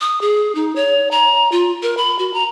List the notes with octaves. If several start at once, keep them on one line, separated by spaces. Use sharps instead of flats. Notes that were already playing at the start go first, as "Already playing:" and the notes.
D#6
G#4
D#4
C#5
A#5
F4
A#4
B5
F#4
A#5